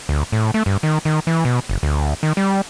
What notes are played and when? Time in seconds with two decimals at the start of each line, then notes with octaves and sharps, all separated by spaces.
0.09 D2
0.32 A2
0.54 A3
0.66 G2
0.83 D#3
1.05 D#3
1.27 E3
1.45 B2
1.69 F#1
1.83 D2
2.23 D#3
2.37 G3